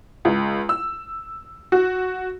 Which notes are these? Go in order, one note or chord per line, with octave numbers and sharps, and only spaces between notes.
C#2
E6
F#4